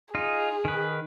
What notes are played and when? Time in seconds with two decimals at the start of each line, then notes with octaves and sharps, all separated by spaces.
0.15 D#4 F4 G#4
0.65 D#3 B4